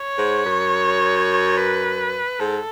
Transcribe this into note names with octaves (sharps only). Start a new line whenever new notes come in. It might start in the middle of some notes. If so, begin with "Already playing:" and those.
Already playing: C#5
G#2
F#2
B4
G#2 A4